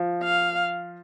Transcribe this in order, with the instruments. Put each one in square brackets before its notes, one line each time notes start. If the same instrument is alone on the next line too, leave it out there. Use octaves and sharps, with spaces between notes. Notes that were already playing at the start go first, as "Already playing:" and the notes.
Already playing: [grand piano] F3
[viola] F5